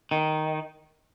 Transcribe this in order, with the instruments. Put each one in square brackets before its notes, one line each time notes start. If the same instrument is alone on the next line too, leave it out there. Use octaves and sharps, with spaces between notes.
[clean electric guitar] D#3